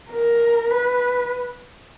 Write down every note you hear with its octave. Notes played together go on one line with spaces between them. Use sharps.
A#4
B4